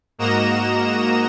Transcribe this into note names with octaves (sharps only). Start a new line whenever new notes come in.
G#2 A#3 F#4 D#5 A#5 E7